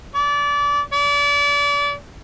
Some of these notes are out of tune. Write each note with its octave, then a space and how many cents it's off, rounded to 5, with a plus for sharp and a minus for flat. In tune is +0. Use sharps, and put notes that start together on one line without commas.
D5 -25
D5 -35